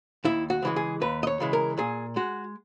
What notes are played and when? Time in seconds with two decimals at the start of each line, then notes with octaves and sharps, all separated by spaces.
0.24 D#2 E4
0.50 F#4
0.62 C#3 E3 G#3
0.76 G#4
1.01 D#2 B4
1.23 D#5
1.27 C#5
1.40 C#3 E3 G#3
1.53 A#4
1.77 A#2 G#4
2.16 G#3 F#4